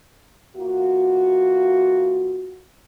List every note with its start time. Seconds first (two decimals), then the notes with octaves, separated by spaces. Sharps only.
0.55 E2 A#3 F4 F#4